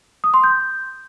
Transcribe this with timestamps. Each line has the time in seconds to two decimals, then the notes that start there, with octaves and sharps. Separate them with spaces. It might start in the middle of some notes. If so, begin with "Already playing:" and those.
0.24 D#6
0.34 C6
0.44 G6